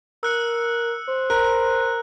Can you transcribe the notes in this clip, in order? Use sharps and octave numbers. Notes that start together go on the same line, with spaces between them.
A#4 E6 F#6 C#7
C5
A#4 F#6